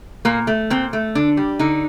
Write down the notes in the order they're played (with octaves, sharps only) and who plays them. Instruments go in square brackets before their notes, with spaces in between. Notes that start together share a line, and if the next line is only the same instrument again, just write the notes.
[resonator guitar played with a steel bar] A#2 A#3
A3
A#2 C4
A3
D3 D4
G3
D3 D#4